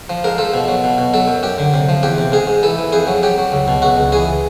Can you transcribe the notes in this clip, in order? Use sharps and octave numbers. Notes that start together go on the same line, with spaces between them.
F3
G#2 A#4
F3 A4
B2
F#3
B2
B2
F#3 A4
F#2
F#2 G4
D3
C3
F3
E2 G4
C3
G#2 G#4
G#2
E3 A4
E3
F2 G#4
F#3
F#3 G4
F#3
C#2
B2
C#2 F#4
C#2
E3 G#4